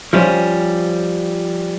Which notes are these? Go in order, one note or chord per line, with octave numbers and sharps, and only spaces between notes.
F3 G3 C#4